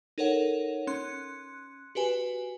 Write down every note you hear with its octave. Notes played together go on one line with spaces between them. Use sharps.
D#4 A4 A#4 C#5 F#5
C#4 C6 F#6
F#4 G4 B4 G#5